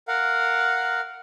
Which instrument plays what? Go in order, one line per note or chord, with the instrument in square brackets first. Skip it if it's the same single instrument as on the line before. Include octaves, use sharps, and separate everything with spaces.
[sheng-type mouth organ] A#4 F5 F#5